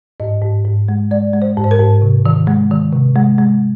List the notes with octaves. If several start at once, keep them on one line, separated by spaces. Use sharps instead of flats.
G#2 D#5
G#2
G#2
G#3
G#3 D5
G#3
C5
G#2
C5
A#4
G#2
C3
D#3
G#3
D#3
C3
G#3
G#3